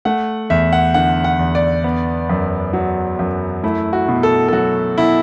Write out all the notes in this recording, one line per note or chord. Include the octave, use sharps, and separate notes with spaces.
A3 F#5
E2 E5
F#5
D3 F#5
F#5
E2
D5
B3
F#2
F#3
F#2
A3 E4
F#4
B2
A4
A4
F#3 F#4
B2 E4